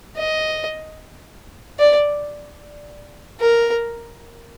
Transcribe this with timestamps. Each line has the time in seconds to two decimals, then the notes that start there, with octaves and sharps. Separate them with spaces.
0.17 D#5
1.79 D5
3.40 A#4